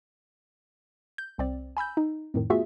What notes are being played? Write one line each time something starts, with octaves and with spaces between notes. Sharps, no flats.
G6
C2 C4 D5
G#5 B5 E6 G6
D#4
F2 A2 D#3
A3 B3 F4 F#4 G#4 E5